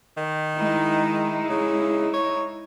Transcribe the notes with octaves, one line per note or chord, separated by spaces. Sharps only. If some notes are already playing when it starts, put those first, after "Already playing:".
D#3
G#3 D#4 E4
C#3
C#5